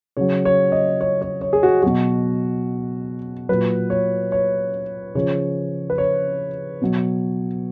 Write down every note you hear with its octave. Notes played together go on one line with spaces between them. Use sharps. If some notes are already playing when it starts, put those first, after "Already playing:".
C#3 F#3 C#5
C#5
D#5
C#5
C#5
C#5
G#4
F#4
B2 F#3 F#4
A#2 F#3 B4
C#5
C#5
C#3 F3 C#5
B4
C#5
B2 F#3